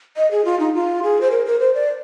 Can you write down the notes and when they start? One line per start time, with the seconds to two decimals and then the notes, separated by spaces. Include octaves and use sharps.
0.17 D#5
0.31 G#4
0.45 F4
0.60 D#4
0.74 F4
1.03 G#4
1.21 C5
1.31 A#4
1.46 A#4
1.60 C5
1.75 D5